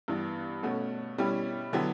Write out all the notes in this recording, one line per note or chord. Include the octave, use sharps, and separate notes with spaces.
G2 E3 B3
B2 A3 C#4 F#4
B2 G3 C#4 E4 G4
D3 F#3 B3 E4 G4